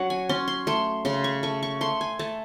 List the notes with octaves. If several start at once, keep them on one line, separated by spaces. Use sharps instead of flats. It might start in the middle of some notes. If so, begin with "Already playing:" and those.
Already playing: F#3 C#4 C#5 F#5
G#5
C#4 C6
C6
A3 C6
C#3 C6
C#6
A3 C#6
C#6
A3 C6
G#5
A3 A5